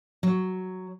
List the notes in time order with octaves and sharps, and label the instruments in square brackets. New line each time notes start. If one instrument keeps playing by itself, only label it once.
[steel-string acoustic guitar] F#3